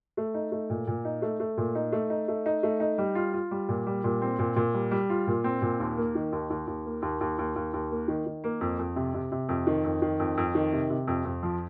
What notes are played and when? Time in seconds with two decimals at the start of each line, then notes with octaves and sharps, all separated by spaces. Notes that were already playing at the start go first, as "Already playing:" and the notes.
0.17 A3
0.34 D#4
0.52 A3
0.70 A#2
0.87 A#2
1.05 D#4
1.22 A3
1.40 A3
1.57 A#2
1.75 D#4
1.92 A3
2.10 D#4
2.28 A3
2.46 D#4
2.63 A3
2.80 D#4
2.98 G3
3.15 F4
3.33 F4
3.51 G3
3.69 A#2
3.87 G3
4.04 A#2
4.22 C4
4.39 A#2
4.56 A#2
4.74 G3
4.91 G3
5.10 F4
5.27 A#2
5.44 C4
5.62 A#2
5.80 D#2
5.97 A#3
6.15 D#3
6.32 D#2
6.50 D#2
6.67 D#2
6.85 A#3
7.02 D#2
7.21 D#2
7.39 D#2
7.56 D#2
7.73 D#2
7.91 A#3
8.08 D#3
8.26 D#3
8.44 A#3
8.61 F2
8.79 F2
8.96 C3
9.14 C3
9.32 C3
9.49 F2
9.67 D#3
9.84 F2
10.02 D#3
10.20 F2
10.37 F2
10.55 D#3
10.73 C3
10.90 C3
11.07 F2
11.25 F2
11.43 F3